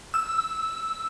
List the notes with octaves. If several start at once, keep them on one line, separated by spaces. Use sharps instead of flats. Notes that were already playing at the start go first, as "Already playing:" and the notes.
E6